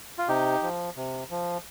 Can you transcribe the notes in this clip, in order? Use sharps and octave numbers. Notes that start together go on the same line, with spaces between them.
F4
C3 D#4 G4
F3
C3
F3